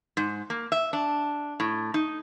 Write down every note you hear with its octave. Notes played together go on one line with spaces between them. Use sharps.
G#2
A#3
E5
D4
A2
D#4